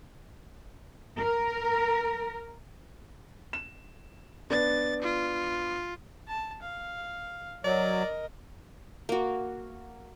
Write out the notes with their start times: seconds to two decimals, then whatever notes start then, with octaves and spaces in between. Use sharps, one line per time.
1.19 A#4
3.53 E7
4.50 B3 D4 A6
5.02 F4
6.28 A5
6.62 F5
7.64 F#3 A#4 D5 D#5
9.09 A#3 F#4